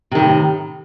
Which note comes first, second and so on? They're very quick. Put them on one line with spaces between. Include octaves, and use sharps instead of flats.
C3 D#3 A2